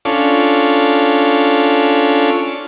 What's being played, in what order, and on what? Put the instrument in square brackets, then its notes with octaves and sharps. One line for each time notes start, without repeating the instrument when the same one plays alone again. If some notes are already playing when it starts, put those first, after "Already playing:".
[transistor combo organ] C#4 D4 F4 A4